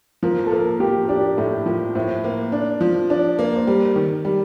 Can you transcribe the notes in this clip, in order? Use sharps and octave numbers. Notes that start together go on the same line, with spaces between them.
F3 A#4
A4
A#3 A#4
F3 G4
D4 G4
A2 A4
F3 A#4
A2 C5
A#3
D4
F3
D4
A#3
C5
G3 A#4
D#3
G3